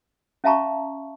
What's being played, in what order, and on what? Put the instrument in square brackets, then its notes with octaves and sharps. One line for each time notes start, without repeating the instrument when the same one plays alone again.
[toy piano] C#4 E5 F5 A5 A#5 C#6